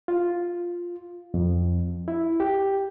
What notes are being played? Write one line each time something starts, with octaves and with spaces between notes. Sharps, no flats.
F4
F2
E4
G4